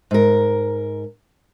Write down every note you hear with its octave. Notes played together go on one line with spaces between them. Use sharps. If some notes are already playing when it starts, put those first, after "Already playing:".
G#2 A#4